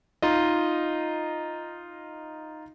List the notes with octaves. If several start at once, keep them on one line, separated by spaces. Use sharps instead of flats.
D#4 F4 D#5